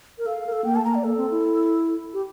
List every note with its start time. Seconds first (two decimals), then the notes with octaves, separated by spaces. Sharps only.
0.18 A#4
0.26 A4 F5
0.40 A4
0.46 A#4
0.52 A4
0.65 A#3 G5
0.75 A5
0.84 A#3 A#5
0.95 D5
1.04 A#3 A4
1.17 C4
1.31 E4
2.14 G4